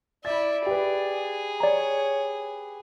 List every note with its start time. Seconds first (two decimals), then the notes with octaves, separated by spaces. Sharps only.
0.25 E4 D5 E5 A6
0.67 G4 G#4 B4
1.60 C#5 D5 A#5